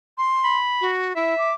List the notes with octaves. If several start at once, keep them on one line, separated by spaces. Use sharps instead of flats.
C6
B5
F#4
E4 E5
D6